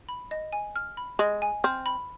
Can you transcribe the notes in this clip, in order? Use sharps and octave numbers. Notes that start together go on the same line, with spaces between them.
B5
D#5
G#5
F6
B5
G#3 D#5
G#5
C4 F6
B5